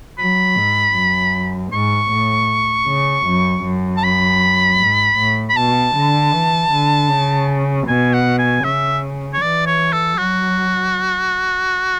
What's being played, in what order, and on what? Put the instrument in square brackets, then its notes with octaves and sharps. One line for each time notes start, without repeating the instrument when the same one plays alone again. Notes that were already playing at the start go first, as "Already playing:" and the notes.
[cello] F#3 [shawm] B5
[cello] G#2
F#2
[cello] G#2 [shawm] C#6
[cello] A2
C#3
F#2
F#2
[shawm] A5
B5
[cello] G#2
A2
[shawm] B5
[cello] B2 [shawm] A5
[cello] D3
E3
D3
C#3
[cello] B2 [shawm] G#5
[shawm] F#5
G#5
[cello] C#3 [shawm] E5
[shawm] C#5
[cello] E3 [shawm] D5
[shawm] C#5
A4
[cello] F#3 [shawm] F#4